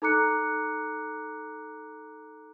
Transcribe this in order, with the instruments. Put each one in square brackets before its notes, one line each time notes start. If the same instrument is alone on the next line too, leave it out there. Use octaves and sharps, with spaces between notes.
[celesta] D#4 A4 A#5 D6 F#6 C#7